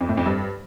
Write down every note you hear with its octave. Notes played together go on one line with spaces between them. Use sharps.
F2
A2
F2
G2